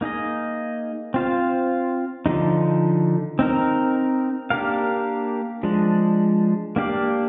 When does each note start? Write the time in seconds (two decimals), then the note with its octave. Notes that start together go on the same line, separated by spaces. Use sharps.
0.01 A#3 D#4 G#4 D#5
1.14 C4 F4 C5 F5
2.26 D3 F3 G#3 D#4
3.39 C4 D#4 A#4
4.50 A#3 D4 G4 A#4 F5
5.63 F3 G#3 D4
6.76 A#3 D4 G4 D5 F5